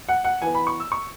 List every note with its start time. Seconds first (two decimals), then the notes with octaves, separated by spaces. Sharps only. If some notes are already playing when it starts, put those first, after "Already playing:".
0.09 F#5
0.24 F#5
0.42 E3 B3 G#5
0.54 B5
0.67 C#6
0.80 E6
0.92 C#6